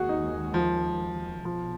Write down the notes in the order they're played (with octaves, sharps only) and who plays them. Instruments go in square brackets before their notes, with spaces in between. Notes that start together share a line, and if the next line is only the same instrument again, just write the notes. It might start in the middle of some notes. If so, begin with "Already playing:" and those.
Already playing: [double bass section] D#2 D#3 G#3 [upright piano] F#4 G#4
[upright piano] D#4
F3
[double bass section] B1 B2 [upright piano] F3